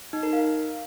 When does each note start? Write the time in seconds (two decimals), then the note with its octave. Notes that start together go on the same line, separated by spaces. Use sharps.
0.13 D#4
0.23 A#4
0.33 F5